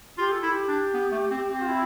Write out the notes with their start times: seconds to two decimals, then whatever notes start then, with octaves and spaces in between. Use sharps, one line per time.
0.18 F4 G4
0.31 A4
0.43 E4
0.45 G4
0.68 D4
0.94 B3
1.12 A3
1.31 C4
1.50 C4
1.60 F4
1.69 E4